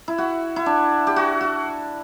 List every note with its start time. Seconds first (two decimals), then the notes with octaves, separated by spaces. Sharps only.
0.08 E4
0.18 F#4
0.56 E4
0.66 D4
1.07 G4
1.16 F#4
1.41 F#4